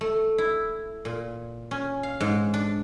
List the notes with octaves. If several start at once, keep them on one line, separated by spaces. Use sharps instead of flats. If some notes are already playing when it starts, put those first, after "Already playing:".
A3
E4
A#2
C#4
F5
G#2
D4